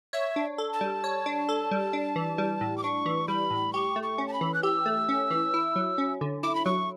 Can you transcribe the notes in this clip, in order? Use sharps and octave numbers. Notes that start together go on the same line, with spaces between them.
C#5 E5
D4
A4
A5
G3
C#5
D4
A4
G3
D4
E3
G3
A2
D6
D4 C#6
E3
G3 B5
A2
G4 C#6
A3
C#6
C#4
A5
B5
E3
F#6
G4 E6
A3
C#4
E3
E4
F#3
C#4
D3
E4 D6
B5
F#3 C#6